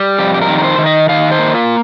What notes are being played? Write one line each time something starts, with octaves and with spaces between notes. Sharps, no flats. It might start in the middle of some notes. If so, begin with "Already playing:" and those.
Already playing: G3
F2 G4
G4
A#4
D#3
A#4
C5
D#3
D#5
D#3 F5
C5
A#3
F4